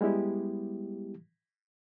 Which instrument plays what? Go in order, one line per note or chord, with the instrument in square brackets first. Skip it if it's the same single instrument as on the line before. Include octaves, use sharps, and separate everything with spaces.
[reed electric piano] G3 G#3 B3 E4 G4